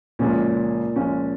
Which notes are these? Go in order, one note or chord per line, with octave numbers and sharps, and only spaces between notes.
C#2 A#2 C#3 F3 G#3 C#4
C#2 C#3 F3 G#3 C#4